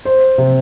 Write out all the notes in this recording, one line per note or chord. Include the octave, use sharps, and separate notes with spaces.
C5
C3